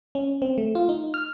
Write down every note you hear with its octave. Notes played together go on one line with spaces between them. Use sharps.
C#4
C4
A3
F4
D#4
F6